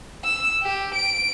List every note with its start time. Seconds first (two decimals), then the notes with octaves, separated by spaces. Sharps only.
0.24 E6
0.63 G4
0.95 D7